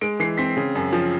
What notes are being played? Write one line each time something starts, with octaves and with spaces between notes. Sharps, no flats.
G#3 D7
E3 C7
C4 B6
C#3
F#2
F3